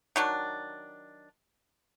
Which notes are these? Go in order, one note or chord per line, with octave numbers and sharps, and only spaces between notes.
D#3 F#3 D4